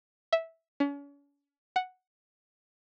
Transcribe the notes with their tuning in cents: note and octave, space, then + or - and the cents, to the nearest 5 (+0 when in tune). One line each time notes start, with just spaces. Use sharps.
E5 -10
C#4 +40
F#5 +0